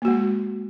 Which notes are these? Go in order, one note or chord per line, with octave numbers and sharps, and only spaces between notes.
G#3 A#3 F#4